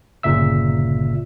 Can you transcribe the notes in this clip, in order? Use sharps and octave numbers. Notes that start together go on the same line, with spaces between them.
G1 A#2 C#3 E5 E6